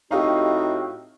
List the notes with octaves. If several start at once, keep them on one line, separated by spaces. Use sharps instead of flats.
A2 C4 D#4 F#4 G4 D#5 F5